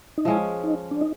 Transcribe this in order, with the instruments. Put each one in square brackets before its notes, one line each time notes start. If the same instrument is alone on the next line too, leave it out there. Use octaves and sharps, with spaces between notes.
[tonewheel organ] D#4
[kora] F3 G#3 C#4 [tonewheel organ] E4
[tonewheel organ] D#4
D4
D#4